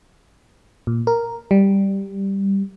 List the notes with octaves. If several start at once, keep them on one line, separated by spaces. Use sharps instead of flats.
A#2
A#4
G3